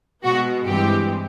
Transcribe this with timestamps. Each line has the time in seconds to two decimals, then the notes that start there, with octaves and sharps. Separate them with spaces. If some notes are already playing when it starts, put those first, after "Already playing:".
0.24 B2 G#3 B3 F#4
0.66 G2 E3 G#3 C4 G4